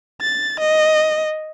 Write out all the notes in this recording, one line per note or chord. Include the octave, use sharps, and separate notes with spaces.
A6
D#5